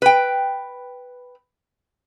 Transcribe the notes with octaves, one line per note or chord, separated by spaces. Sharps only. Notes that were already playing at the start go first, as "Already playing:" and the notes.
B4 G5